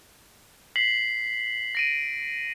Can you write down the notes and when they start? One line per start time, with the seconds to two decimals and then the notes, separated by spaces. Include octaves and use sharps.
0.76 B6 C7 F#7
1.75 A#6 D7 D#7